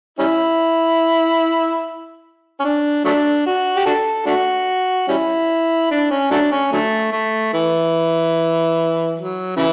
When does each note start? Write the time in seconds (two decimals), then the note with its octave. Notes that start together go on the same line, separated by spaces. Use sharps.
0.19 G3 C#4 E4
2.60 C#4
2.64 D4
3.05 F#3 A3 D4
3.46 F#4
3.76 G4
3.86 D4 F#4 A4
4.26 A3 D4 F#4
5.08 G3 C#4 E4
5.90 D4
6.11 C#4
6.31 F#3 A3 D4
6.52 C#4
6.72 D3 F#3 A3
7.12 A3
7.53 E3
9.16 F#3
9.56 C#3 E3